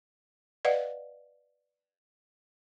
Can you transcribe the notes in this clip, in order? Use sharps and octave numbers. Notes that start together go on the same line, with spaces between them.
B4 D5 D#5 F5 F#5